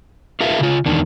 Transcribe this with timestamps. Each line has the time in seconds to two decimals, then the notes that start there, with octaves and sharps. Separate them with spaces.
0.41 F4 G#4 A#4 B4 E5 F5
0.60 C#3 F4
0.86 E2 D#3 D4